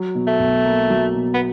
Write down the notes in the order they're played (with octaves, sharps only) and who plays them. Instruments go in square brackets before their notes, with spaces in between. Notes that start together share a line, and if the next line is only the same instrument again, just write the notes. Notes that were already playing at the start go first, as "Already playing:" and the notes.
Already playing: [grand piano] F#3
B2
[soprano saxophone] A3
[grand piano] B1
A#3
F#3
B2
[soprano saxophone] B3